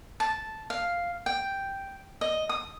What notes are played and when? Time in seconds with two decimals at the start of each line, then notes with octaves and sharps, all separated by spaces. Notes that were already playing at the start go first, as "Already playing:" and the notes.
0.20 A5
0.70 F5
1.26 G5
2.21 D#5
2.49 D#6